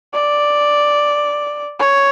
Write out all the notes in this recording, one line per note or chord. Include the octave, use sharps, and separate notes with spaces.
D5
C#5